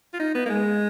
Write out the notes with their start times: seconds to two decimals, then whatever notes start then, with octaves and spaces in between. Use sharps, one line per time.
0.13 F4
0.20 D#4
0.35 B3
0.46 A#3
0.49 G#3